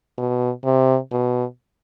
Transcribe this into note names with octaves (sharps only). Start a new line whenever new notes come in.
B2
C3
B2